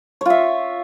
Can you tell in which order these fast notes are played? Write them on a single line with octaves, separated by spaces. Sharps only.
C#5 F4 E5